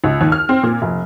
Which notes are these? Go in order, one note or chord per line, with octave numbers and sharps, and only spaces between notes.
C#2
D#2
F6
C4
A#2
F1